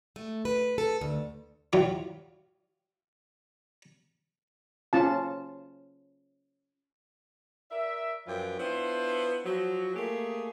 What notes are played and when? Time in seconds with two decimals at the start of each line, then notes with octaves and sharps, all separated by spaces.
0.16 A3
0.45 B4
0.78 A4
1.01 D2
1.73 E3 F#3 G3 F4
4.93 C#4 F4 A5
7.70 A#4 D5 E5
8.26 F#2 F3 F4 B4 G5
8.58 B3 D4 E4 F4 C5
9.45 F3 F#3
9.95 A3 A#3 G4 G#4